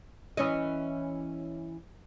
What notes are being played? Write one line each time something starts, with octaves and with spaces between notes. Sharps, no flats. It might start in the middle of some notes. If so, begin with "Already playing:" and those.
E3 C#4 D#5